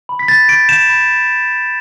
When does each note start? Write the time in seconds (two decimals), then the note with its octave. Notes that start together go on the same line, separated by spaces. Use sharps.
0.09 B5
0.19 B6
0.28 B5 A6
0.48 G6 D7
0.69 G6 E7
0.89 B5